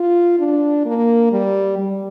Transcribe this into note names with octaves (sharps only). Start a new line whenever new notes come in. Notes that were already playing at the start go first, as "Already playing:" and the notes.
Already playing: F4
D4
A#3
G3
G3